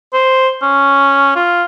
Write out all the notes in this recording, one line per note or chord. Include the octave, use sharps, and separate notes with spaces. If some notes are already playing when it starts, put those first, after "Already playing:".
C5
C#4
F4